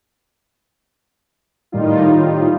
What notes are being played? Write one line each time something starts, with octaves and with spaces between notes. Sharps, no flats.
A2 D#3 G3 D#4 F4